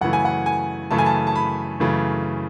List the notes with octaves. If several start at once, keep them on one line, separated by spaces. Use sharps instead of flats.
F#2 C#3 E3 A3 F#5
G#5
F#5
G#5
F#2 C#3 E3 A3 A5
G#5
A5
A5
B5
F#2 C#3 E3 A3